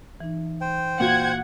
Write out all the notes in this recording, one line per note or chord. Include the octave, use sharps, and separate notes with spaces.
E3 D#4
C5 G5
A#2 F4 F#4 F#5 G#6